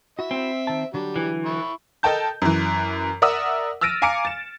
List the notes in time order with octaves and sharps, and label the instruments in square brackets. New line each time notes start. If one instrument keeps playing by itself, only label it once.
[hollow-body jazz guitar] E4 F#4 [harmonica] E5
[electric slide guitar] C4
[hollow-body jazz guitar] D#3 A5
[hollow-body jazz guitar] D3 F#3 D4 [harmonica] G3
[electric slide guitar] E3
[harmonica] E4 B5 C#6
[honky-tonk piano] A4 A#4 D#5 G5 A5 G6
F#2 E3
A#4 D5 E5 F#5 D#6 E6
E6 F6 A6 A#6 D7 D#7
F5 G#5 A#5 D6 C#7 D7
A6 E7